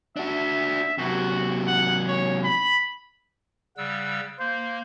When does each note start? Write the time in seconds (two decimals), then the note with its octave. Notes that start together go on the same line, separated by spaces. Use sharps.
0.17 D4 F#4 E5
0.98 C3 F#3 F#4
1.67 F#5
2.08 C#5
2.44 B5
3.77 C#3 G3 F#5 E6
4.39 A#3 C5